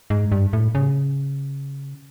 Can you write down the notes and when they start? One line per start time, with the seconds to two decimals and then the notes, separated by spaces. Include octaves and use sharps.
0.10 G#2
0.32 G2
0.53 A2
0.75 C#3